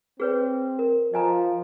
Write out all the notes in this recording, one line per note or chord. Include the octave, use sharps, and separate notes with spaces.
C4 G#4 B4 C#5
A#4
F3 D#5 G#5 A#5